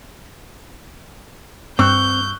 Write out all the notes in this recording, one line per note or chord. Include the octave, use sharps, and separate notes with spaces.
G2 C4 C#6 E6 F#6 G6